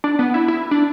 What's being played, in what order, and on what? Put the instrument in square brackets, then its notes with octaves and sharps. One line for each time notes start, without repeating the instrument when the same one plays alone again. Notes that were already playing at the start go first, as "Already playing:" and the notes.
[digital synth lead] D4
B3
E4
E4
D4